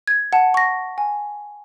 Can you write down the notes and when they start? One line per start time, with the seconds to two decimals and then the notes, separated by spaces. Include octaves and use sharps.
0.07 G#6
0.33 F#5 A5
0.54 C#6 A#6
0.98 G#5